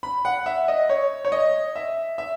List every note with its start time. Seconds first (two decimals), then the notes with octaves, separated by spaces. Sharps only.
0.03 B5
0.25 F#5
0.46 E5
0.68 D#5
0.89 C#5
1.25 C#5
1.32 D#5
1.76 E5
2.18 E5